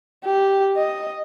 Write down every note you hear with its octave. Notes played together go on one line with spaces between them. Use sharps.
G4
D#5